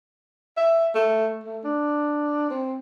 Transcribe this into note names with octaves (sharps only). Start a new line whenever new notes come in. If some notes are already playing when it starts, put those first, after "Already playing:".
E5
A3
A3
D4
C4